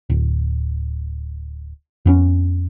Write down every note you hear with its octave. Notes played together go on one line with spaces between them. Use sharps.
D1
F2 B3 C#4